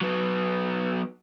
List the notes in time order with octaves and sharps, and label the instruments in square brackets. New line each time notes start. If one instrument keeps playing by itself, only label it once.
[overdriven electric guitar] F#3 B3